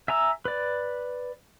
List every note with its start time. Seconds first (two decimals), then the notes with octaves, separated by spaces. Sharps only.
0.08 E5 G#5 A#5 E6
0.45 B4 D5